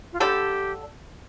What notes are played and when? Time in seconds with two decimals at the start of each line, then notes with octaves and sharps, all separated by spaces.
0.13 F4
0.20 D3 G3 D4 G4 A4